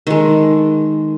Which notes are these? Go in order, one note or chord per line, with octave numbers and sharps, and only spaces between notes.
D#3 G#3 A4